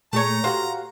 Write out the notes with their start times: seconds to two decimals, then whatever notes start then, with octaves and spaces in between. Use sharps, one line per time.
0.13 A#2 A3 G#4 C#5 A#5 C#7
0.44 F#4 G4 C5 F5 F#5